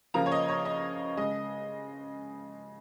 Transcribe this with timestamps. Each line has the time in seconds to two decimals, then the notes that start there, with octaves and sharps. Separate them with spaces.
0.14 C#3 F3 A#3 A#5
0.26 C#5
0.32 D#5
0.49 C#5
0.65 D#5
1.17 C#3 G#3 D#5